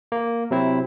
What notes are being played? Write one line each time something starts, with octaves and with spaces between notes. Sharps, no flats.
A#3
C3 F#3 C4 E4